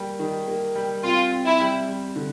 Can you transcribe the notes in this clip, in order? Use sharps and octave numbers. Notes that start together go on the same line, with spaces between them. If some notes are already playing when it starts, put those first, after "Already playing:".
Already playing: G3 A#3
D#3
A#3
G3
C4 F4
C4
E4
G3
G3
D3